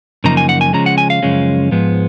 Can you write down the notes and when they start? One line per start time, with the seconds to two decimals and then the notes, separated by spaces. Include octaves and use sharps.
0.24 F#2 C#3 F3 A#3 D#4 A#5
0.37 G#5
0.49 F#5
0.61 G#5
0.73 C#3 F3 G#3 C#4 A#5
0.86 F#5
0.98 G#5
1.10 F5
1.22 F#2 C#3 F3 G#3 C#4
1.72 G#2 F3 G#3 B3